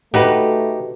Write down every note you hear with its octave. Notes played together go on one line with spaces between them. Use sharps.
A3 D#4 F#4 G4 B4